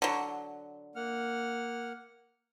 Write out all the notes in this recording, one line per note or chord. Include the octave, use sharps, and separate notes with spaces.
D3 F#3
A#3 F#5 F6